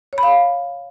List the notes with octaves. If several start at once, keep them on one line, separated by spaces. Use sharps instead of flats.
C#5
B5
F5